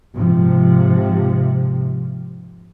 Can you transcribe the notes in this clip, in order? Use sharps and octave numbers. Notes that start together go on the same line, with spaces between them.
G#2 C3 F3